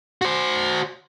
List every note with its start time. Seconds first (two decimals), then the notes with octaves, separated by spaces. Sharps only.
0.22 F#4 C5